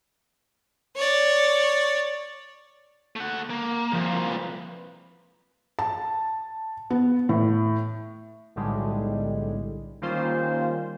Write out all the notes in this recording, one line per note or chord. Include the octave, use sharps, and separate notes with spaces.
C#5 D5
A3 F#5
A#3
C2 A#2 F3 C4
B4
A5
B3
A2
B1 A2 D3 G3 G#3
D#3 G3 A#3 C#4 F4 C5